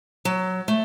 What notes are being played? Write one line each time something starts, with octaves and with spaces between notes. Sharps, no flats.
F#3
A3